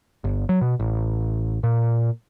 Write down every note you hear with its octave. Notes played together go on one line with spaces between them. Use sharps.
G1
F#3
B2
A1
A#2